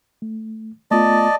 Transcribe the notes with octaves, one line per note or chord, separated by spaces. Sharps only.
A3
A3 B3 F4 D5 D#5 A5